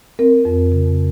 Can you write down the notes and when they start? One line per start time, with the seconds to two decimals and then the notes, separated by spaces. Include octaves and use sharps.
0.19 C4 A#4
0.45 F2
0.72 C#3